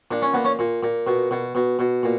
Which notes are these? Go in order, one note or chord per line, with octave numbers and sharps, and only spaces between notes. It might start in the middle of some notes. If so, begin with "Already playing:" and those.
A#2 D4
C#4
A#2 B3
C#4
A#2
A#2
B2
B2
B2
B2
A#2